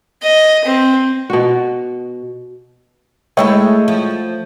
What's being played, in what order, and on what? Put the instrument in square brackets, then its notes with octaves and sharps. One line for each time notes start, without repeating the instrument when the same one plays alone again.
[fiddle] D#5
C4
[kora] B2 F#4
[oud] G#3 A3 E4 [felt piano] C#5 D#5 G5
[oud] F3